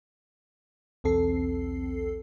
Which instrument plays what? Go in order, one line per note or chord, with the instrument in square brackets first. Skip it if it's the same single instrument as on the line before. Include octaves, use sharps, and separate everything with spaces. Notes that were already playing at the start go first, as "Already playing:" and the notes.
[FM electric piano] B1 E2 C4 A4 C7